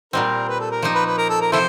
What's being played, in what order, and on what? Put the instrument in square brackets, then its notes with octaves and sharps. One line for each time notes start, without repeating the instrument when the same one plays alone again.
[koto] A#2 G3 C4 [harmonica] D#4 F#4 A#4
[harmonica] B4
A4
A#4
[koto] F3 A#3 D#4
[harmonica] B4
B4
A#4
A4
A#4
[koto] C3 F3 [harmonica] E4 A4 C5